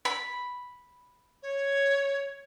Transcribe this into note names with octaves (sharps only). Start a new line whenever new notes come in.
B5
C#5